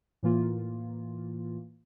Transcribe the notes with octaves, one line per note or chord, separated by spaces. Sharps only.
A2 E3 A#3 F4